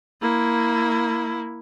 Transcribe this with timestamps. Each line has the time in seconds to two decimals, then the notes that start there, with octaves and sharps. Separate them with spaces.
0.21 A#3 E4